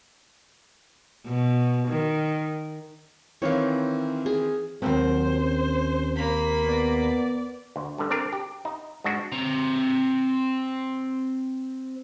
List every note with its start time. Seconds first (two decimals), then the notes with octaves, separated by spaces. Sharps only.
1.26 B2
1.88 D#3
3.42 D#3 E3 C4 C#5 F5
4.26 G#4
4.82 D#2 F#3 C4 C5
5.38 C#4
6.16 A#3 B5
6.65 B3 D5
7.76 D2
7.98 G2 D3
8.10 C4 D4 A#4 D5
8.33 G4
8.65 D#4
9.04 G#2 G#3 D4 F#4
9.32 C4 A#5